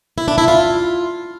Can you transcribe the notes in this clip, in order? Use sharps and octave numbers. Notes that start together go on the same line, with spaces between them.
E4
D4
E4
F4